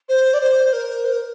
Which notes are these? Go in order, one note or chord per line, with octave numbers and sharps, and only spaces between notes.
C5
D5
C5
A#4
C5
A#4